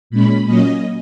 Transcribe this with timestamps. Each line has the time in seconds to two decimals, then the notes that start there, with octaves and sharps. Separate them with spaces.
0.10 A#2 G#3 C#4 B5
0.45 A#2 F#3 A#3 C#4 D#5